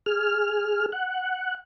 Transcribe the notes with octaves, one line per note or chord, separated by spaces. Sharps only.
G#4 F6
F#5